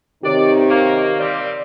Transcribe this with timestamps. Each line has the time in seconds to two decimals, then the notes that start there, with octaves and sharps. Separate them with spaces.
0.23 C3 D#3 G4 C#5 D5
0.70 A#3
1.19 G3 C4 G4 D5 F5